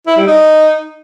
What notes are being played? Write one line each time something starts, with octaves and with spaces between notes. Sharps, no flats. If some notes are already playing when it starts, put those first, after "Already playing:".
E4
G3
D#4